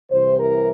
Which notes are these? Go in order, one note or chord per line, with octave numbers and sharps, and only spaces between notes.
C2 C3 E3 C5
A#4